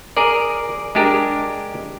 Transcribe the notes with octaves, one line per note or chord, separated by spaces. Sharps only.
G#4 A#4 D5
G#3 D4 G4 A#4